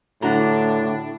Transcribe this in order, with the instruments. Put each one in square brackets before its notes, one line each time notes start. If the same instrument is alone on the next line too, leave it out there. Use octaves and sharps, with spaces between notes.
[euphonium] A2 [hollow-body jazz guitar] D3 F#4 A#5 [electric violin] D4